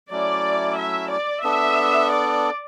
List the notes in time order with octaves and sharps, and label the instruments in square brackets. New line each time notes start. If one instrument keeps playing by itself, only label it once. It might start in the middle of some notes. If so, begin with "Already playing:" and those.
[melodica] F#3 A3 C#4 E4 [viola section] D5
[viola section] E5
D5
[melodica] B3 D4 A4 [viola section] E5
[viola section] D5